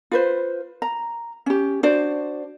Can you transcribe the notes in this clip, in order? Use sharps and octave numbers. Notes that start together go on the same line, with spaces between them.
F4 B4 C5
A#5
C#4 G4
D4 F#4 C5 D5